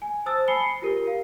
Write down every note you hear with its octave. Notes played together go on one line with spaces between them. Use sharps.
G#5
C5 A5 D#6 E6 A6
G#5 B5 C7 C#7 G7
C7
F4 G4 A#4
F5